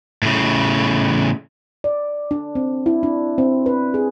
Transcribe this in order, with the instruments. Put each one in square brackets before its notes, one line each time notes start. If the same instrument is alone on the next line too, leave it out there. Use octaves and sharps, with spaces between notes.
[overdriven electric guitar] A2 C#3
[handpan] D5
D4
C4
E4
D4
C4
B4
G#4